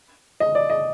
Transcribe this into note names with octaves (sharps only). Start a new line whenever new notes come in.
D#5
D5
D#5